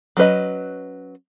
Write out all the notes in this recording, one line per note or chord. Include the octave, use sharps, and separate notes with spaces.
F#3 C#4 B4 D#5